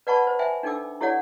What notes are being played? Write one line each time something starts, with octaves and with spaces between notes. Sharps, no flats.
B4 D5 F#5 A5 B5 C#6
C5
C5 E5 G5 G#5
D4 D#4 A4 G5 D6 E6
E4 G4 A4 C#5 D5 F#5